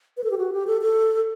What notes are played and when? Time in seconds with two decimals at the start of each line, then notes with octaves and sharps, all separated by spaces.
0.17 B4
0.24 A4
0.31 G4
0.38 F#4
0.53 G4
0.67 A4
0.81 A4